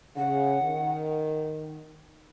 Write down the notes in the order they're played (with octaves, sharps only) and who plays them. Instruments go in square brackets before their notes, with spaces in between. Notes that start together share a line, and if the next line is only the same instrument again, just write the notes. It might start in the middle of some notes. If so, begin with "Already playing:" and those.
[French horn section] C#3 [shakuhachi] F#5
[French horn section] D#3